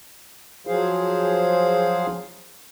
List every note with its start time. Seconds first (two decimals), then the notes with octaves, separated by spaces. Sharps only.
0.67 F3 F#3 G#4 C5 F5